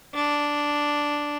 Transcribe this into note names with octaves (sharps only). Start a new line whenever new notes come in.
D4